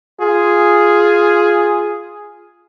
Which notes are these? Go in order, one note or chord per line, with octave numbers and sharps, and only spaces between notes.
F4 G#4